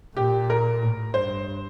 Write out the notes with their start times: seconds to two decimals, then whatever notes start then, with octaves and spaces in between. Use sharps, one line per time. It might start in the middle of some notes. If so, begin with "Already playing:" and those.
0.16 A#2 G4
0.50 A#4
0.82 A2
1.14 G2 C5